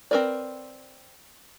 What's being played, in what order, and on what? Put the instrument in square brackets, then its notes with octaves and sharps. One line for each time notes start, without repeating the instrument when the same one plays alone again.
[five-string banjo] C4 F4 A#4 B4 D5